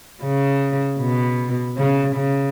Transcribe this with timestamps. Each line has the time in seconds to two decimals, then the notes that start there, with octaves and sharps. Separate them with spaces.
0.23 C#3
1.00 B2
1.77 C#3
2.16 C#3